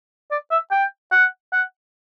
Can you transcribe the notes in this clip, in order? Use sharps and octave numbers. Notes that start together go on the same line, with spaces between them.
D5
E5
G5
F#5
F#5